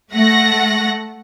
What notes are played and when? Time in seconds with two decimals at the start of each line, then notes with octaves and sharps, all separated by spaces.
0.13 A3 F#5 A#6